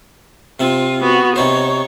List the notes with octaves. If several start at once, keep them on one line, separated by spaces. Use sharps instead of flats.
C3 C4 F4
B3 F#4
C3 D#4 C5 C#5